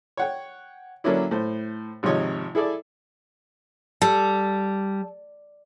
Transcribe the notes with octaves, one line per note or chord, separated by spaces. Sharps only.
C#5 F#5 G5
D3 F#3 A#3 C#4 D4 E4
A2 C5
G#1 C3 F3 D#4 C#5 D#5
E4 G#4 A4 D5
G3 A4